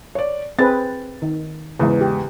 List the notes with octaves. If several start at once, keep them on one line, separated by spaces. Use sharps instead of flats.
C#5 D5
C4 G#4 B4 A6
D#3
E2 G#2 C#3 E3
G4